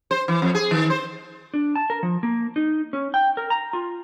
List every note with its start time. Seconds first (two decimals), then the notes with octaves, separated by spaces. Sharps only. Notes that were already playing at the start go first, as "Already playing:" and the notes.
0.11 C5
0.28 E3
0.42 F2
0.55 G#4
0.71 D#3
0.90 C5
1.54 D4
1.76 A5
1.90 A#4
2.03 F3
2.23 A#3
2.56 D#4
2.93 C#4
3.14 G5
3.37 A#4
3.50 A#5
3.73 F4